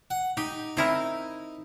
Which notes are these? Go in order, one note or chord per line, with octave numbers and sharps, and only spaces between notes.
F#5
D#4 G4
C4 D#4 E4 A#4